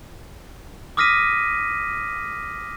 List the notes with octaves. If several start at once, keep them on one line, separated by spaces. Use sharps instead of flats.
D6 D#6 F6 A#6 B6 D#7